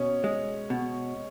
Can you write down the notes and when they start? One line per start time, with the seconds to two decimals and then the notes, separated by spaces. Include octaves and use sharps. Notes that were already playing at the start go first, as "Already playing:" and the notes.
Already playing: B2 C#4
0.24 G#3
0.70 B2